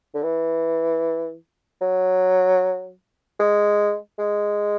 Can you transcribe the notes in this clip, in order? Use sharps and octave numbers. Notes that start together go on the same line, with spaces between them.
D3
E3
F#3
G#3
G#3